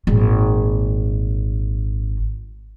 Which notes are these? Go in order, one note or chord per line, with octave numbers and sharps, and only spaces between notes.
G#1 A#2